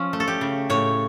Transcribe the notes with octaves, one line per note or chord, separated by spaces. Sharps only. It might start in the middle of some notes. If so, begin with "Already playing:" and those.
Already playing: F3 C#4
A3
A4
G4
C#3
A2 C#5